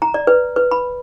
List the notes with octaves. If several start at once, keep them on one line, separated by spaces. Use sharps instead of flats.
A#5
D5
B4
B4
B5